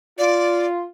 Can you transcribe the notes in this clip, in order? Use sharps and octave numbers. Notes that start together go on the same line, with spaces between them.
F4 D5